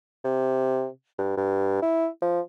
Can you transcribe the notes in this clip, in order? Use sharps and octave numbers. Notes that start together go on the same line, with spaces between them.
C3
G2
G2
E4
F3